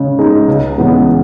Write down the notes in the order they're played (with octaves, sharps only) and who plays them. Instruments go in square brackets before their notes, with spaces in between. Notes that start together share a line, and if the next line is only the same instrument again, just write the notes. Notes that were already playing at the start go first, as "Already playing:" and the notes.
Already playing: [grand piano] C#3 G#3
G#3 D#4
C#2
C#3 E3 G#3 B3